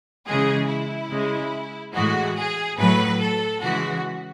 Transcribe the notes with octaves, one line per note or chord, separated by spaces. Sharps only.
C#3 E3 G#3 G#4
E4
C#3 G#3
A2 E3 G#3 F#4
G#4
A2 F#3 B4
A4
C#3 E3 G#3 F#4